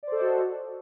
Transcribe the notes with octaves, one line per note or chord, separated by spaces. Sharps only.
F#4 A4 C5 D5 D#5